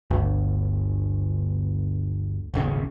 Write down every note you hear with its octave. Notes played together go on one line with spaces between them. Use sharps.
G1 D2
D#1 G#1 C#3